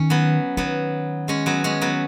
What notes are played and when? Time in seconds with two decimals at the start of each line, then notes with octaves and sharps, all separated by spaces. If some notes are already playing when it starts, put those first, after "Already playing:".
Already playing: D#3 C#4
0.10 F#3 B3
0.57 D#3 F#3 B3
1.28 G#3 C#4
1.46 F#3 B3
1.64 G#3 C#4
1.81 F#3 B3